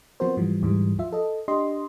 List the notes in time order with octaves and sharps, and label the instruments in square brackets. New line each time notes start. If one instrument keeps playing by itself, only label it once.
[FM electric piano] F3 B3 C4 F#4 A#4 C5
G#2 E3 F3 G3
D2 G#2 E3 G3
F3 F4 E5
A4 D#5
D4 G4 D#5 C6